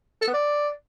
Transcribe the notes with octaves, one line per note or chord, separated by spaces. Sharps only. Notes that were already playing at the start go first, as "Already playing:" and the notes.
A4
B3
D5